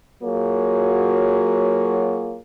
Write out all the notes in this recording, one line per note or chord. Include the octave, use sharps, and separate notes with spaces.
F#3 A#3 F4 F#4 G#4 C#5